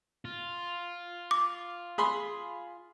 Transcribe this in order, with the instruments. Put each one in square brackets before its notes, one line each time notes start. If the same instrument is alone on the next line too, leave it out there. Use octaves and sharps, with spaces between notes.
[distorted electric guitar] F4
[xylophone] D6
[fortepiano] G#4 B5 C6